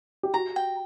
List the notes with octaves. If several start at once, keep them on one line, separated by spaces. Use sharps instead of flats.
G4
F#4 A#5
G5